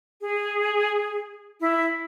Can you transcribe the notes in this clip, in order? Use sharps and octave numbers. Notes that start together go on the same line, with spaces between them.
G#4
E4